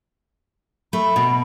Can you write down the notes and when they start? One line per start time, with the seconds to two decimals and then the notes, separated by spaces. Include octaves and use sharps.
0.93 A3 B5
1.16 B2